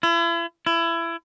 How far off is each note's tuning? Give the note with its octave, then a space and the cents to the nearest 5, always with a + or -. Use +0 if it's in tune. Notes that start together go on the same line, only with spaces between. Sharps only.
E4 +40
E4 +25